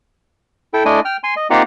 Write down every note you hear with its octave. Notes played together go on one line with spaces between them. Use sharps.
E4 A4 G5
A3 D4 E4 D#5 G#5
G5 F6
G#5 C6
D#5
A#3 C4 D#4 F4 G4 F#5